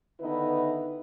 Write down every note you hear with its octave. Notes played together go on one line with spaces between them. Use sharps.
D3 D#3 B3 D#4 E4 B4